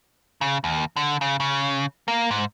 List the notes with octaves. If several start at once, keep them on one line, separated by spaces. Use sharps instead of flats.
C#3
D#2
D3
C#3
C#3
A#3
G#2